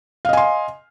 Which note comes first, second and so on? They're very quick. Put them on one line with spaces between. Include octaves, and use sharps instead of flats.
F5 D#5 G#5 C6